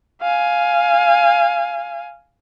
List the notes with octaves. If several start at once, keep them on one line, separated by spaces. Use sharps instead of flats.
F5 G#5